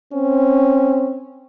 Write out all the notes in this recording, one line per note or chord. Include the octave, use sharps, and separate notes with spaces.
C4 C#4